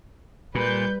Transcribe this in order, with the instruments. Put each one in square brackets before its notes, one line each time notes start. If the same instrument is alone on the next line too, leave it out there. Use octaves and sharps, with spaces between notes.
[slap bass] A#2 [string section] G3 B4 G6